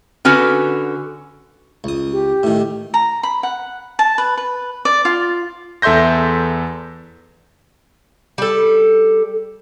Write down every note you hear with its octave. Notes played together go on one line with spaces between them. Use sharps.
D3 C#4 F#4 B4
C#2 D#6
G4
A2 D#3
A#5
B5
F#5
A5
B4
B4
D5
F4
E2 A4 E5 C6 G6 A#6
G3 A4